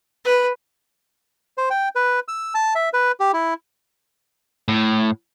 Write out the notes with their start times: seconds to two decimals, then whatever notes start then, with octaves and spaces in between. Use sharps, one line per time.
0.25 B4
1.58 C5
1.70 G5
1.96 B4
2.28 E6
2.55 A5
2.75 E5
2.93 B4
3.20 G4
3.33 E4
4.68 A2